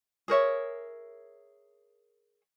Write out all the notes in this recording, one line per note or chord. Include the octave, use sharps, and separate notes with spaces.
G#4 A#4 C#5 E5